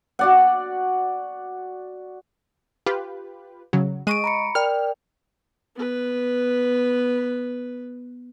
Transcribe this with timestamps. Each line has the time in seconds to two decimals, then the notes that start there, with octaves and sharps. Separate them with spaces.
0.19 F#4 D5 F#5
2.86 F4 G4 B4
3.73 C#3 F#3
4.07 G#3 D#5 C#6 D7 D#7
4.24 A#5 B5 C#7
4.55 A#4 D5 G5 F6
5.76 B3 B4